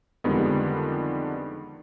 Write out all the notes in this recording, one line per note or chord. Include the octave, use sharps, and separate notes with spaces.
F2 D3 D#3 G3 G#3 B3